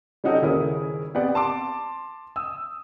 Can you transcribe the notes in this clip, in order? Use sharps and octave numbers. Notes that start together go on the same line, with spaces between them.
G3 C#4 D#4 F#4 G4 A4
D#1 C#3 E4 A#4 C#5 D#6
B3 C4 G4 D5 F#5
A5 C6 D6
D#6 E6